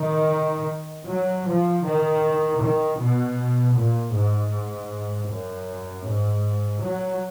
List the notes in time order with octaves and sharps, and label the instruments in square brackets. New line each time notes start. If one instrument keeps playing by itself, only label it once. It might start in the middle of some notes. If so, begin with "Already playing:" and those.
Already playing: [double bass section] D#3
F#3
F3
D#3
D#3
B2
A#2
G#2
F#2
G#2
F#3